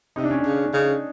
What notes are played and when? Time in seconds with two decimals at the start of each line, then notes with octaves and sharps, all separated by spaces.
0.16 C3 D#4
0.24 D4
0.31 C#4
0.39 D4
0.46 C#3
0.65 D4
0.73 C#3 D#4